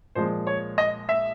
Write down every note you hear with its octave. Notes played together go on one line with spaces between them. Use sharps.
A#2 F3 G#3 C5
C#5
D#5
E5